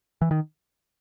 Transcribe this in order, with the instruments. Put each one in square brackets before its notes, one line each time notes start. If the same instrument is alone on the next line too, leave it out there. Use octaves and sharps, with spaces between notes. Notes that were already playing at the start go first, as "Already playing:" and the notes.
[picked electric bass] E3
D#3